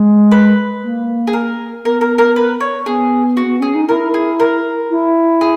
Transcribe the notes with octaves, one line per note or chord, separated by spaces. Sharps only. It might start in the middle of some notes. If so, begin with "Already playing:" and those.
Already playing: G#3
B4
A#3
G#4
A#4
B3 A#4
A#4
A#4
B4
C#5
B3 G#4
F#4
B3
C#4 G#4
D#4
E4 A#4
G#4
A#4
E4
G#4